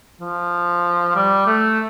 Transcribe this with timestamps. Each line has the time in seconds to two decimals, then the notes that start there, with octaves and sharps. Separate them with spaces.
0.21 F3
1.16 G3
1.47 A3